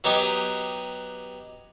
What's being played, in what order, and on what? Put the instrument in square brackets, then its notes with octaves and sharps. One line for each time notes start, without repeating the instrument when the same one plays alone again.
[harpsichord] F#3 B3 D#4 G4 G#5 D#6